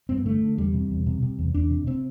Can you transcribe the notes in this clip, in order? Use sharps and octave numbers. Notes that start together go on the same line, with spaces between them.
G2 C4
B3
D3 A3
D3
E2 G3
C3
E2
C3
C3
E2
E2 D4
C3
C3 C4